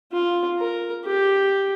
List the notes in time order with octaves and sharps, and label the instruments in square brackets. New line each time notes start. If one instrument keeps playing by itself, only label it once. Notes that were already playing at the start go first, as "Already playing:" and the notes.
[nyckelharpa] F4
A#4
G4